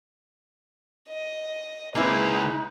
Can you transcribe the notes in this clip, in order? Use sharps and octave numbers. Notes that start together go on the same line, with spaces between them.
D#5
C#2 A#3 C4 D#4 E4 G#4 B4